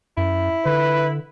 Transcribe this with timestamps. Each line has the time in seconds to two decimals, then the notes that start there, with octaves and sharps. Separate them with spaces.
0.17 F#2 E4
0.65 D3 B4